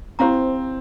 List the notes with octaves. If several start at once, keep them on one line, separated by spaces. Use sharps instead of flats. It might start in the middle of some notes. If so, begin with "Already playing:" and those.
C4 E4 G4 C5 F5 A#5